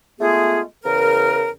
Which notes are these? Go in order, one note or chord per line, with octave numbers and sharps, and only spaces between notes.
G#3 A3 B3 F4 G#4
E2 C#3 A#4